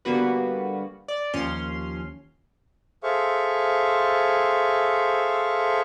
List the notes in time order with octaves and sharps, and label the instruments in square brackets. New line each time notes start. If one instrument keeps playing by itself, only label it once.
[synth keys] D3 G3 A#3 B3 F#4 B4
D5
D#2 F3 C#4 C6 F6
[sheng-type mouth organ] G#4 A4 C5 E5 F5 C#6